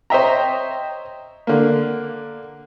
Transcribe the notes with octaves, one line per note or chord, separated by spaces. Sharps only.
C5 C#5 D#5 E5 G5 A#5
D3 A#3